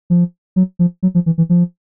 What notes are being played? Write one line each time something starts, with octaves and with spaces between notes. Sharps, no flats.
F3
F#3
F3
F#3
F3
E3
E3
F3